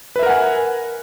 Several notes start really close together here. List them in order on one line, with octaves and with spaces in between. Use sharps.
B4 E5 A#4 F#5 G#5